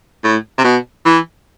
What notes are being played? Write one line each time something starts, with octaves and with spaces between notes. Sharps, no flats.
A2
C3
B2
E3